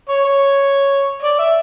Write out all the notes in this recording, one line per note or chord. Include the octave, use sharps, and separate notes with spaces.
C#5
C#5
D5
E5